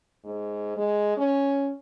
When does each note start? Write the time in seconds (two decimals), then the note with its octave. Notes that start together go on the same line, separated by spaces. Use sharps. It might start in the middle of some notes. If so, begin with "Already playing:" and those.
0.24 G#2
0.77 G#3
1.17 C#4